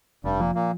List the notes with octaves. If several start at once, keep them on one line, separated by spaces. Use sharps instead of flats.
F1 G2 G3
A#2 F3 A#3
A#2 A#3